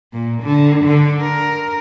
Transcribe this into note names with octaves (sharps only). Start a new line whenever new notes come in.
A#2
D3
D3
A#4